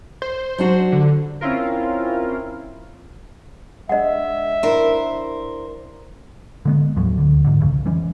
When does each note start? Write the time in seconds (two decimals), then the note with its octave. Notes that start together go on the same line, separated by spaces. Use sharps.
0.22 C5
0.58 F#3 D4 F#4
0.92 D3
1.41 C4 C#4 E4 F4 A#4
3.89 G#3 D4 D#5 E5 F#5
4.63 D4 E4 A#4 C5
6.65 D3 G#3 B3
6.96 D#2 A2 F3 F#3
7.18 D2 D3
7.44 G#2 D3
7.60 C2 F2 C#3
7.86 E3 G3 C#4